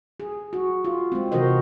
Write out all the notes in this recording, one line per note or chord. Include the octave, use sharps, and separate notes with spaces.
G#4
F#4
F4
G#3 C4
C3 E3 F#4 A#4 C5 D#5